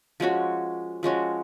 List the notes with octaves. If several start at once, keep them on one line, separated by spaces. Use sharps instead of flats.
F3 G#3 C#4 F#4
F3 G#3 C#4 F#4